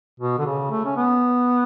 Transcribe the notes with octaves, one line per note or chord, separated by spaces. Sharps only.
B2
D3
C#3
A3
C#4
B3